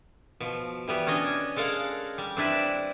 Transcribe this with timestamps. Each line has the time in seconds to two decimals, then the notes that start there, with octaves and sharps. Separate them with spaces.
0.40 B2 F3
0.88 E3 G3 B3
1.07 C#4 D4 D#5 G#5
1.56 G#3 A4 A#4 F5 F#5
2.18 G3
2.37 C4 D4 E4 B4